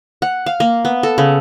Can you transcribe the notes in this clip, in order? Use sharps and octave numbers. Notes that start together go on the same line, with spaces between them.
F#5
F5
A#3
B3
A4
C#3